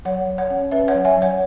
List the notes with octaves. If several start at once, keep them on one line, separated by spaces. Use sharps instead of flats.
F#3 C#5 F#5
F#3
C#5 F#5
C#4
C#4 B4 E5
C#5 F#5
F#3
E5 G#5
F#3
C#5 F#5